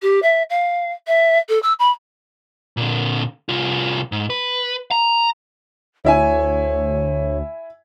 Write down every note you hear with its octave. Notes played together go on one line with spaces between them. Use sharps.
G4
E5
F5
E5
A4
E6
B5
A#2 D3
C2 F4
G#2
B4
A#5
D2 E4 C#5 E5 G#5